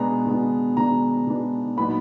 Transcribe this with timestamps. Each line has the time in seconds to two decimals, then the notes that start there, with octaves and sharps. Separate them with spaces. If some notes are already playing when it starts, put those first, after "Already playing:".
Already playing: B2 G#3 B3 D4 A#5
0.26 B2 G#3 B3 D4
0.77 B2 G#3 B3 D4 A#5
1.27 B2 G#3 B3 D4
1.77 A#2 F#3 B3 D#4 B5